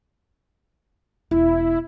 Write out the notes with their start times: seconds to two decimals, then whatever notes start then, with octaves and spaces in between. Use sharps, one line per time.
1.31 E1 E4